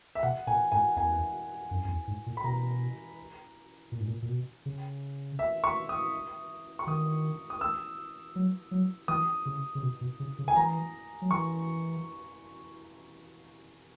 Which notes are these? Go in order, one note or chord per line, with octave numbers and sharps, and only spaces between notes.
E5
B2 F#5
A#2 G#5
G#2 G#5
E2 G#5
F#2
F#2
E2
G#2
A#2
B5
B2 A#5
A#2
G#2
A#2
A#2
B2
C#3
E5
C#6
D#6
C#6
D#3 D#6
D#6
E6
F#3
F#3
E3 D#6
C#3
C#3
B2
B2
C#3
C#3
G#5
E3 A#5
F#3
E3 C#6